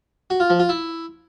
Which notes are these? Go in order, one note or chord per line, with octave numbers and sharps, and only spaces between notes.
F#4
F4
F3
F4
E4